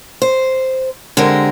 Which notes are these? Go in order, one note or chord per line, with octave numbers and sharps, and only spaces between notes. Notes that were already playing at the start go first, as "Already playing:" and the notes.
C5
D3 G#3 C4 G4 A#4